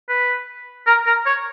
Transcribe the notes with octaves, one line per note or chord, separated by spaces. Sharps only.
B4
A#4
A#4
C#5